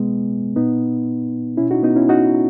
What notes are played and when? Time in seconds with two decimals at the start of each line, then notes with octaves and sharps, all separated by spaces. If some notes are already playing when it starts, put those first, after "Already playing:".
Already playing: B2 G#3 B3
0.56 A#2 B3 D#4
1.57 B2 C#4 E4
1.71 D#4 F#4
1.83 B3 D#4
1.96 C#4 E4
2.09 D#4 F#4